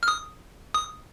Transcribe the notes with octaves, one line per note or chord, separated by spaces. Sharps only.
F6
D#6
D#6